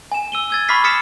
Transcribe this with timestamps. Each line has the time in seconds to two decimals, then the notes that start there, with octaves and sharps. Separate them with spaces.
0.12 G#5 E7
0.32 E6 D#7 G7
0.50 E6 G#6 A6
0.68 B5 C#6 D6 F6 B6 C7
0.84 D#6 F6 A6 B6 C#7 E7